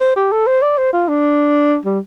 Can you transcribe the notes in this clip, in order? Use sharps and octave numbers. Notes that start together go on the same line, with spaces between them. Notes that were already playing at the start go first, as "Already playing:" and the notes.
C5
G4
A4
C5
D5
C5
F4
D4
G3